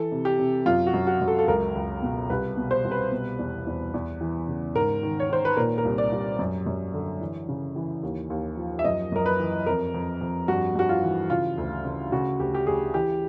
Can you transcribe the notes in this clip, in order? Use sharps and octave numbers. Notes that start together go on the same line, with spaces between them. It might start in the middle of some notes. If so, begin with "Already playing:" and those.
Already playing: E3 A4
C3
G4
C3
F#2 F4
F#4
F#2
F#4
F#2
A4
A4
C#2 A#4
C#2
B2
C2 B4
B2
C5
C2
B4
B2
E2
E2
E2
E3
C#3
G#2 A#4
D#3
C#5
D#3 C5
B4
A#2 A#4
A#4
C2
D5
C2
F#2
F#2
D3
E3
C#3
E3
D#2
D#2
F3
E5
F#2 D#5
F#2 A#4
B4
E3
F2 A#4
F2
F2
G2 F#4
G2 F#4
F4
E3
C#3 F4
D2
C#3
C#3 F#4
D2 G4
G4
D2 G#4
E3 G4